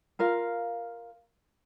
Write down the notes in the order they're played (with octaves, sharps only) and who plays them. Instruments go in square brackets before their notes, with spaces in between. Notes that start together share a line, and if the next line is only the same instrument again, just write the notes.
[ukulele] F4 A#4 F5